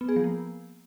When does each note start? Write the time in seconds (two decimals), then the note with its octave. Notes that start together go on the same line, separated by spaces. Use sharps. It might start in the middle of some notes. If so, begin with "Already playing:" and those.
0.01 B3
0.09 G#4
0.16 F3
0.24 A#3